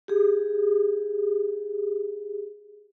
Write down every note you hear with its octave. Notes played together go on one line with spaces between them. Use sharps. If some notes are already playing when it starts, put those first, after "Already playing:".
G4 G#4